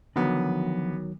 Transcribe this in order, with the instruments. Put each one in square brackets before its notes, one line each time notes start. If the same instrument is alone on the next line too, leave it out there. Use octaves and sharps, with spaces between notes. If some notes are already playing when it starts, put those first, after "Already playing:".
[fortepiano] D2 B3 [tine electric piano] D#3 F#3 [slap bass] F3 D4